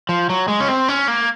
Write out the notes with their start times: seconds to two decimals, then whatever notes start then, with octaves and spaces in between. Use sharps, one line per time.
0.09 F3
0.29 F#3
0.48 G#3
0.60 C#4
0.68 C4
0.88 C#4
1.08 A#3